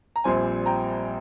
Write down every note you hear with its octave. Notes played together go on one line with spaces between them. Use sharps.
A#5
A#1 A#2 G3 C4 G#5 C6
G5 A#5